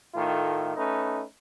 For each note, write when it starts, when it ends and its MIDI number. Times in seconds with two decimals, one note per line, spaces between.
0.14 0.71 45
0.14 0.71 51
0.14 0.71 57
0.14 0.71 65
0.75 1.22 57
0.75 1.22 61
0.75 1.22 63
0.75 1.22 71